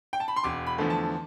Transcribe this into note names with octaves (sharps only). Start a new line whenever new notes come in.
G5
A5
B5
C6
E1 D6
B5
E2 D3 F3 A3
A5